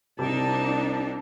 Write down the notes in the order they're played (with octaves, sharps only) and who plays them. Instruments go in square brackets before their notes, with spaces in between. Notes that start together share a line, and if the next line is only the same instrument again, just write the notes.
[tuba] C2 [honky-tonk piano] C3 [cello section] D4 D#4 [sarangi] A5